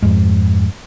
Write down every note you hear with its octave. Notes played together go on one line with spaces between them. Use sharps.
F2 G#2